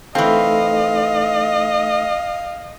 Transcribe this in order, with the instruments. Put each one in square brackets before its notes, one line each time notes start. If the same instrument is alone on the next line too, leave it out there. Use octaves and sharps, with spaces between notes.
[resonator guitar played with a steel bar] E3 C4 [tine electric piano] A3 D#4 A4 [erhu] D#5 [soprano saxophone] F5